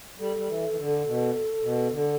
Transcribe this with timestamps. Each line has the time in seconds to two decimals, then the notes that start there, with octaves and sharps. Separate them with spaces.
0.19 G3 A4
0.37 G3
0.47 E3
0.69 E3
0.77 D3
1.05 B2
1.62 B2
1.90 D3